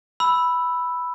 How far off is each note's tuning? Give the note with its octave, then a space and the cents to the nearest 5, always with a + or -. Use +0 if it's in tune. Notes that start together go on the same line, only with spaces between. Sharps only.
B5 +0 E6 +0